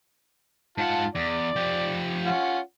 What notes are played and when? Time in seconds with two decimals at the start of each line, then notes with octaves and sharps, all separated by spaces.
0.78 G#2 F4 F#5 A5
1.15 E2 D5
1.56 F3 G4
2.26 C#4 F4 F#5